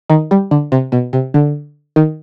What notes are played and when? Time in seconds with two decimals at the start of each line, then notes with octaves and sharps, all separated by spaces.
0.10 D#3
0.31 G3
0.51 D3
0.72 C3
0.92 B2
1.13 C3
1.34 D3
1.96 D#3